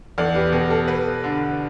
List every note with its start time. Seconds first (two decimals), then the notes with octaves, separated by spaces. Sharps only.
0.18 E2 A4 D5
0.35 G4 B4
0.52 B2 G4
0.70 A4
0.88 B4
1.24 D3